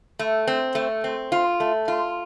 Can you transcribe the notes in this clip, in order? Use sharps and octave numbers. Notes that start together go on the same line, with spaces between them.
A3
C4
A3
C4
F4
A3
F4